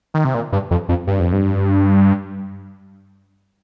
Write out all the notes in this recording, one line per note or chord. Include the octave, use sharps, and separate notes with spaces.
D#3
C3
A#2
G2
F2
F2
G2
F2
G2